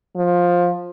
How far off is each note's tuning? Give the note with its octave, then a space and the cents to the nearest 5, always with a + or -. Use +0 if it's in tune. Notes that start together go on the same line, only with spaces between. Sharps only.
F3 +15